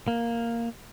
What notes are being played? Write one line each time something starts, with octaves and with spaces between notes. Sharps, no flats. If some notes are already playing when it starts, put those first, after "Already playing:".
A#3